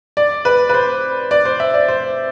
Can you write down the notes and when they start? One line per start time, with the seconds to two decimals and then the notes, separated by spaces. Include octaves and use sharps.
0.17 D5
0.45 B4
0.69 B4
0.74 C5
1.31 D5
1.45 C5
1.60 E5
1.74 D5
1.88 C5